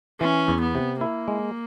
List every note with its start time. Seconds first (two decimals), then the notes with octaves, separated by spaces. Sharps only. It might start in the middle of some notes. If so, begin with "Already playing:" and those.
0.20 E3 C#4
0.48 E2
0.61 B3
0.75 C3
1.01 A#3 E4
1.28 G#3